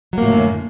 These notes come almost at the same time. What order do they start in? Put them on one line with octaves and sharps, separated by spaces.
F#3 A#3 A2 D3 F#2